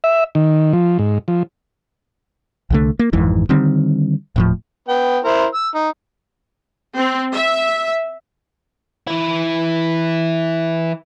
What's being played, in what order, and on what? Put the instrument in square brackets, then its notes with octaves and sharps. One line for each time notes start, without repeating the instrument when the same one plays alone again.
[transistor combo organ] E5
D#3
F3
G#2
F3
[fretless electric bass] C2 D3 A3
A#3
G#1 F2 G#2 E3
D3 D#3 G3 C4
D#1 A2 F3
[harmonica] B3 G5
E4 A#4 C5
E6
D#4
[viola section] C4
E5
[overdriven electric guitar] E3 E4